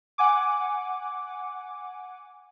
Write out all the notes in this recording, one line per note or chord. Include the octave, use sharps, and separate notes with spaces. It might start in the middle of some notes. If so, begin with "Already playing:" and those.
F#5 G#5 D6